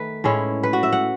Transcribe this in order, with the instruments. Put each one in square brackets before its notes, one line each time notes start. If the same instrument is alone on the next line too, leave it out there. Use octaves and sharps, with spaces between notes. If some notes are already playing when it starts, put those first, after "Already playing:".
Already playing: [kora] D#3 A3 B4
A2 G#3 C#4 E4
B4
F#4
E5
F#5